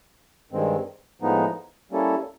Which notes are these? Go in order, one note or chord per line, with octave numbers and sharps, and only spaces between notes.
G2 D#3 G#3 C4
A2 F3 G#3 B3 D#4
G3 A#3 C#4 E4 A4